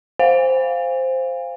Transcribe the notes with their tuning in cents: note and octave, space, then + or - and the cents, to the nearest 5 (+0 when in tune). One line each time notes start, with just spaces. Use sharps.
C5 +0 F5 +0 G#5 -40